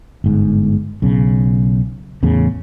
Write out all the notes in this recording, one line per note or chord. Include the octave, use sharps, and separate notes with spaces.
G1 G#2
B1 C#3
E2 A2 C#3